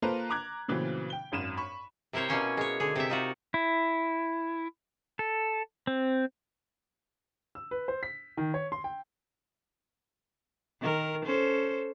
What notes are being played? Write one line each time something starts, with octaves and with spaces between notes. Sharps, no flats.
A#3 F4 A4 B4 C5 A#5
A#5 D6 F#6 G#6
A#2 C#3 E3 F#3 A3 C4
G5 G7
G#1 F#2 D#7 E7
B5 C#6
C3 E4 A#4 C5 C#5
B2 A#3 C#4 G#5
G#3 C#5
D3 G#4
C3 G4 E5
D#4 F4 F#4
E4
A4
C4
E6
B4
C5
B6
D#3
C#5
C6
G5
D#3 A#4
C#4 A4 C5